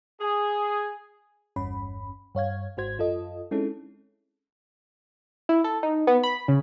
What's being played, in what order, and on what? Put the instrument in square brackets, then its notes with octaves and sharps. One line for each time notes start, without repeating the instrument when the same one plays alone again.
[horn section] G#4
[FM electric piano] G1 E2 G2 C#4 B5
G2 C#5 F5 G#6
G#1 G#2 F#4 C5 G#6
F#2 F4 A4 D#5
G#3 C4 C#4 D#4 E4 A4
[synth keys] E4
A4
D#4
B3
B5
C#3